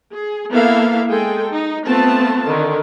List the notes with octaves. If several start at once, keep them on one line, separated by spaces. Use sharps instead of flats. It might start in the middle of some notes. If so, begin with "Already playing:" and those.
G#4
A#3 B3 E4 A4 E5 F5
G#3 G#4 A4 G5
D#4
A3 B3 C4 F4 A5
D3 D#3